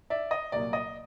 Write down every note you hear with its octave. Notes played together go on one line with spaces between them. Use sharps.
D5 E5
D#5
C2 A#2 F#3 A#3 D5
D#5